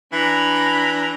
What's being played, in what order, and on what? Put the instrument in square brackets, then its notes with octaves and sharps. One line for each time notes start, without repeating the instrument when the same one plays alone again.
[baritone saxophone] E3 [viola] D4 A#5 [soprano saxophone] B5